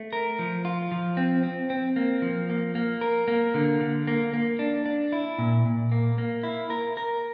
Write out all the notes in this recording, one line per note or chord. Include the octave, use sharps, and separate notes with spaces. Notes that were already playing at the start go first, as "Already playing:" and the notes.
Already playing: A3
A#4
F3
F4
F3
C4
C4
C4
A#3
F3
A#3
A#3
A#4
A#3
D3
D3
A#3
A#3
D4
D4
E4
A#2
A#2
A#3
A#3
E4
A#4
A#4